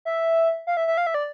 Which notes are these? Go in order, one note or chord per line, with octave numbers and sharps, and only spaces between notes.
E5
F5
E5
E5
F5
E5
D5